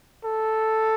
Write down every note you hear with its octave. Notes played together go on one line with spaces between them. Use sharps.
A4